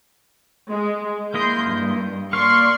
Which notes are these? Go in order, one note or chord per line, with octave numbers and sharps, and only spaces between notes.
G#3
A#3 E4 D#5 C6 G6
G2
A#3 D5 F5 C6 C#6